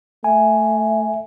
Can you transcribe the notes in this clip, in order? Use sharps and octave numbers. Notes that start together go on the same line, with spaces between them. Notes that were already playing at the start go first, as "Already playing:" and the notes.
A3 E5 G#5